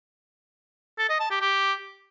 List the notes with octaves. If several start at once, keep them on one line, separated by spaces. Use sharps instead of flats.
A4
D#5
A5
G4
G4